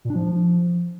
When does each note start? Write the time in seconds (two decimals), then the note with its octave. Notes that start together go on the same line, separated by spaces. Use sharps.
0.05 A#2
0.10 D4
0.15 F3